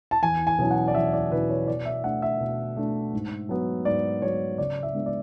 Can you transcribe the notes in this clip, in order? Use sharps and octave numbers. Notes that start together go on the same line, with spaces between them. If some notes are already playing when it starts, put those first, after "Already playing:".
A5
E2 G#5
G#5
B2 F#3 C#4 E4
F#5
D5
E2 E5
D5
B2 F#3 C#4 E4 B4
C#5
B2 D5
E5
A3 D4 F#5
E5
B2
A3 D4
G#2
F#3 B3
G#2 D5
F#3 B3 C#5
C#3 D5
E5
G#3 B3 D4
D5